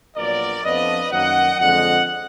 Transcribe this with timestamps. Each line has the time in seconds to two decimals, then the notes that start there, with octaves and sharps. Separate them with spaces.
0.16 A#1 A#2 F#3 B3 A#4 D5
0.64 F2 F3 B3 D4 B4 D#5
1.11 F#2 D#3 F#3 A#3 D#5 F#5
1.59 F2 D3 G#3 D#5 F#5